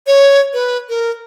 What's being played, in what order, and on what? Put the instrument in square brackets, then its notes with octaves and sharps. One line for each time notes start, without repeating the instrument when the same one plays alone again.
[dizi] C#5
B4
A#4